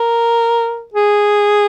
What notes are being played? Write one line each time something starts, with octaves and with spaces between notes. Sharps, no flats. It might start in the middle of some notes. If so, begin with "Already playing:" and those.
Already playing: A#4
G#4